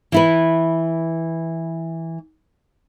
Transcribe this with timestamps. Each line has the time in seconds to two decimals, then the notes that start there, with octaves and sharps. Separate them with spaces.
0.12 E3 E4 B4